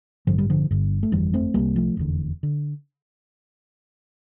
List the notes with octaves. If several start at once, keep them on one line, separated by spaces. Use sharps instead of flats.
A1 G2 D3 F3
G3
D3 F3
G1 G2 D3
A3
G1 F2 D3 E3 G3
A3 C4
C2 C3 G3 A#3
F3 A3
F1 E2 D3
D3